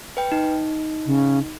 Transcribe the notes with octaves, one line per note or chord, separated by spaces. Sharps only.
B4 G5
D#4
C#3